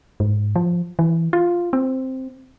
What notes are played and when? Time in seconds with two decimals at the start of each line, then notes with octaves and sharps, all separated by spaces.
0.20 G#2
0.56 F3
0.99 E3
1.33 F4
1.73 C4